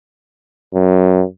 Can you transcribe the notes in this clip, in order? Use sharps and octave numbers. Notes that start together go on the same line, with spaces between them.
F#2